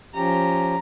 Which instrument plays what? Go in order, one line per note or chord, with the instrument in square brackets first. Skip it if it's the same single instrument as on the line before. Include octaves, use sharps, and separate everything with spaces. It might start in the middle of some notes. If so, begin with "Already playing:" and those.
[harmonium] F3 C#4 G4 [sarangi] A#5